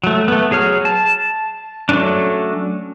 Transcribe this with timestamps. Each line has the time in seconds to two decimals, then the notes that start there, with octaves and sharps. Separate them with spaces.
0.04 F#3 A3
0.28 A3 B3
0.51 F#3 G#4 C#5 F6
0.85 A5
1.89 F#3 A3 B3 C#4 D4